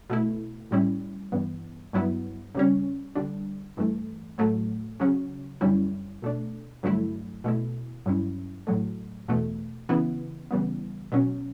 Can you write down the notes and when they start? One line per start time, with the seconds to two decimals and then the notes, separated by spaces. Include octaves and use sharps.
0.10 B2 A3 E4
0.71 A2 G3 C#4 E4
1.32 G2 E3 B3
1.93 G2 F#3 B3 E4
2.55 C#3 G3 C#4
3.16 D3 G3 D4
3.77 G2 E3 A3
4.38 A2 F#3 A3
5.00 C#3 F#3 C#4
5.61 F#2 D3 G3 C#4 E4
6.22 B2 A3 D4
6.83 G2 D3 F#3 A3 E4
7.44 B2 A3 E4
8.06 G2 F#3 C#4 E4
8.67 A2 F#3 A3
9.28 E2 B2 A3
9.89 C#3 E3 B3 E4
10.51 C#3 E3 G3 B3
11.12 B2 F#3 C#4